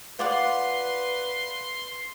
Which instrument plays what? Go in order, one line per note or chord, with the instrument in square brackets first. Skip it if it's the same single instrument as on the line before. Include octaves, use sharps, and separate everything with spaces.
[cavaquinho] F4 D5 F#5 [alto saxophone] B4 [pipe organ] C6